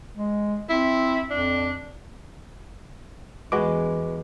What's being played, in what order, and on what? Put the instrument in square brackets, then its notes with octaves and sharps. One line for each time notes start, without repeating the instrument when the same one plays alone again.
[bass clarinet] G#3
[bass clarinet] C4 [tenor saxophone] E4
[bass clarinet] F2 [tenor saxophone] D4
[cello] E2 [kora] G#3 [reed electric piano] F#4 B4 D6